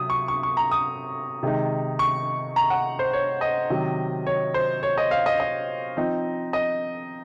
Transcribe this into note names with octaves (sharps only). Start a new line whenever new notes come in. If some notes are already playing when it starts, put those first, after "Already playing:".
Already playing: C3 F#3 C4 D#6
C#6
C#6
C#6
A#5
D#6
C3 D#3 G#3 D#4
C#6
A#5
F#5
C5
C#5
D#5
C3 D#3 F#3
C#5
C5
C#5
D#5
F5
D#5
D#5
F3 C4 D#4
D#5